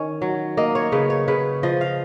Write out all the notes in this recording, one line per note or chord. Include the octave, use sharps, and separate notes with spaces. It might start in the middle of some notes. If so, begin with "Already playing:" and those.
Already playing: D#3 C#4
F#3
A#3 D#5
C#5
C#3 B4
C#5
C#3 B4
F3 D#5
F5